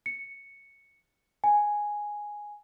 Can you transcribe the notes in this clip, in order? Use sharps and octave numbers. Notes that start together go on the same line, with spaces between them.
C#7
G#5